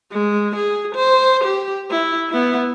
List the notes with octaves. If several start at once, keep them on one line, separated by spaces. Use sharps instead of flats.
G#3
G#4
C5
G4
E4
B3 E4